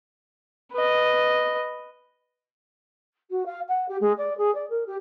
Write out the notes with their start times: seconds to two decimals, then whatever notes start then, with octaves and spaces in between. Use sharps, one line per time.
0.72 B4 D#5
3.30 F#4
3.45 F5
3.68 F#5
3.88 G4
4.01 G#3
4.17 D5
4.37 G#4
4.54 D5
4.69 A#4
4.86 G4